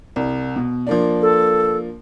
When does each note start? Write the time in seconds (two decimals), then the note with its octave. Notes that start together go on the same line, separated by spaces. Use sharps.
0.16 C2
0.56 B2
0.87 F3 A#3 D4
1.22 A4